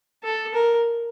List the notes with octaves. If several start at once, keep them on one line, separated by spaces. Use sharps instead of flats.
A4
A#4